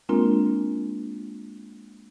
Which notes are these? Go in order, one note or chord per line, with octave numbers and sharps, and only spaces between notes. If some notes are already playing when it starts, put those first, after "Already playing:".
G#3 A#3 C4 D4 F4 A#4